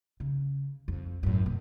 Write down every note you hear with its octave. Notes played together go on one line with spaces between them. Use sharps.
C#3
F2
F#2 A2
B2